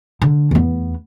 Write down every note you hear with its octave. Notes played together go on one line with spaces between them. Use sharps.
D3
E2 B3